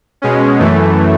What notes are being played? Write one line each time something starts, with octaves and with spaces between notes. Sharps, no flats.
B2 G#3 C#4
F#2 E3 A3